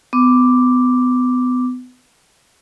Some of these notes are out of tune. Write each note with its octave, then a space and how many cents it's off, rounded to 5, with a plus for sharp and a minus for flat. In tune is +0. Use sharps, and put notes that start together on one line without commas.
B3 +30 D6 +0